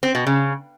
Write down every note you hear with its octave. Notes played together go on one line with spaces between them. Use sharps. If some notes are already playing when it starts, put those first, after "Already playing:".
C4
B2
C#3